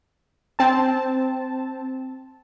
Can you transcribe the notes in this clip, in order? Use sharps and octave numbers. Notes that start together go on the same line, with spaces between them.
C4 A5